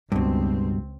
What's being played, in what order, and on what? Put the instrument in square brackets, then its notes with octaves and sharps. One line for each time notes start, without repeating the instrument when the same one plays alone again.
[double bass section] C#2 C4 [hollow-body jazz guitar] G2 B2